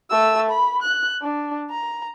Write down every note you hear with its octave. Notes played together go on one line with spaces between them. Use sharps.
A3 E6
B5
F#6
D4
A#5